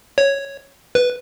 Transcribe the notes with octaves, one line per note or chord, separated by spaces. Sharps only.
C#5
B4